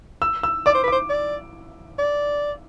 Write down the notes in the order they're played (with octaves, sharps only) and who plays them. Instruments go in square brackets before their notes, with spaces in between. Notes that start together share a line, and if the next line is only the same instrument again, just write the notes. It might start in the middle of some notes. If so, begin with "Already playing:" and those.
[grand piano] E6
E6
[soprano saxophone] D5 [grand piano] D6
[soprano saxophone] C5
B4
[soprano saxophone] C5 [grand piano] D6
[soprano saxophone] D5
D5